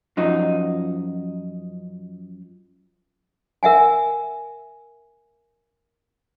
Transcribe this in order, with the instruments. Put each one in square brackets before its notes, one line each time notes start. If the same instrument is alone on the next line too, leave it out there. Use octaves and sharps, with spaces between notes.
[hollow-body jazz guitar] F#2 F3 D#4
[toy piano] A#4 E5 F#5 G#5